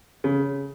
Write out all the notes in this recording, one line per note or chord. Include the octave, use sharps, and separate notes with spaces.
C#3